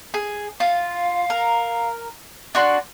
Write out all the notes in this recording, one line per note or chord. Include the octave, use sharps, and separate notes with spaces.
G#4
F4 F5
A#4
D4 F#4 D5 C6